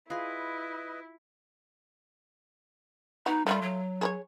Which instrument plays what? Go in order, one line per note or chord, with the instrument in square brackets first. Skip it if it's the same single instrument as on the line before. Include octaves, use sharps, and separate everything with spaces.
[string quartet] E4 [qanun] F4 G#4 [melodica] B4 D#5
[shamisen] B3 F#4 [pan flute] D#4
[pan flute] G3 [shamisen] A3 E4 F4
[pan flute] F#3
[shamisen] G#4 A#4 C#5